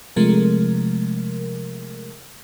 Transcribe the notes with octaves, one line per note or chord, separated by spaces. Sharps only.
C3 F3 G#3 A3 A#4